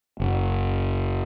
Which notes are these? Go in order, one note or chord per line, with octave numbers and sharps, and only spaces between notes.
F#1